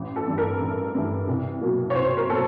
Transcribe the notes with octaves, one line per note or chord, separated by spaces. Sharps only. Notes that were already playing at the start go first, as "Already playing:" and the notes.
Already playing: A1
A4
G2 E3 A3
A#4
A1
G2 E3 A3
C2
B2 F#3 A#3
C#5
C2 C5
A#4
B2 F#3 A#3 A4